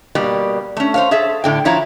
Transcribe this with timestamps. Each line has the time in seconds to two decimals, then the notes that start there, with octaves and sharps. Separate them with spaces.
0.15 B2 G3 A#3
0.77 A3 C#4
0.94 C5 C#5 F5
1.11 G#4 A4 E5
1.44 A2 D3 G5
1.65 F3 E4 C#5 F5 A#5